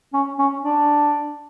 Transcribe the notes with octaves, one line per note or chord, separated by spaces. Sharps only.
C#4
C#4
D4